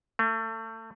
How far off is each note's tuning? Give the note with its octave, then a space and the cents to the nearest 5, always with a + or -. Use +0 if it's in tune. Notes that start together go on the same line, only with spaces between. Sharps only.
A3 +30